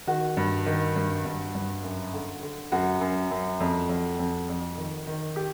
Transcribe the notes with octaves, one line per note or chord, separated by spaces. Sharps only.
D#3 F#4
G2
D#3
G2
G2
G2
F#2
D3
D3
F#2 F#4
F#2
F#2
F2
F2
F2
F2
D#3
D#3
G4